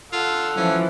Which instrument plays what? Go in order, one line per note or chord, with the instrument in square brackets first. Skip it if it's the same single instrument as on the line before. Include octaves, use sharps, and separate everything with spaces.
[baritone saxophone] F4 [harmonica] A4 F#5 E6
[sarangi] E3 [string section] F3 [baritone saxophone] C#4